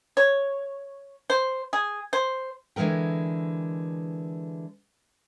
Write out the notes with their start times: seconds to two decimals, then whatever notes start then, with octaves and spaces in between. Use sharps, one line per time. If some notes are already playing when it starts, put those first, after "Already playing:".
0.17 C#5
1.30 C5
1.73 G#4
2.13 C5
2.76 D3 E3 G#3 A#4 G5